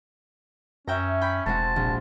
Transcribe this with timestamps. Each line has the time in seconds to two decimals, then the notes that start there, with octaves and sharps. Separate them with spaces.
0.87 F#2 C#4 E5 G5 A#5
1.21 G5 B5 C#6
1.46 E1 G#3 C4 F#4 A5
1.76 A#1